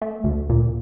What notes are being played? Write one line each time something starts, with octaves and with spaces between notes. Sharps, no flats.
A3
D2
A#2